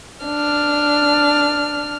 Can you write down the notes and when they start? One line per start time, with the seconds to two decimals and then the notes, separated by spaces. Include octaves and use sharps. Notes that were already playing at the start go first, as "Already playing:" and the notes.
0.25 D4 F6